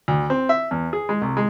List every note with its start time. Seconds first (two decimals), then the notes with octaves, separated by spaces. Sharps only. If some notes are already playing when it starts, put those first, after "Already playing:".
0.08 D2
0.30 C4
0.49 E5
0.71 E2
0.93 G#4
1.09 G#3
1.22 C2
1.37 G#3